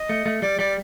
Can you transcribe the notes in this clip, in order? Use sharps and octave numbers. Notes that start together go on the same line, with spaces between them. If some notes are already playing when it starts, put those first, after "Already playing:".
Already playing: D#5
A3
A3
G3 D5
G3 D5